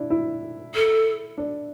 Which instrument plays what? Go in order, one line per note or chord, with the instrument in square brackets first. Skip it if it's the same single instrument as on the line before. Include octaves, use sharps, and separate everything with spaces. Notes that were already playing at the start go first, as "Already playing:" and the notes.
Already playing: [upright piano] D4 E4
E4
[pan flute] A4
[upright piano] D4